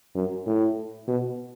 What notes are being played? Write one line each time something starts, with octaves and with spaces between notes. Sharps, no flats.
F#2
A2
B2